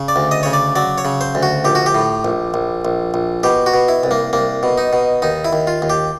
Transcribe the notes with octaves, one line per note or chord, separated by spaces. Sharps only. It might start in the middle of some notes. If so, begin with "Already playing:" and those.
Already playing: C#3
D5
D2
D#5
C#3 C#5
D5
F#3 D5
C#5
C#3
C5
D2
F#4
A#1 G4
F#4
G4
A2
A#1
A#1
A#1
A#1
B2 G4
F#4
B2
E4
C2
A#3
C2 A#3
B2
D#4
B2
D#2 D#4
E4
D#2
F4
D#2
G4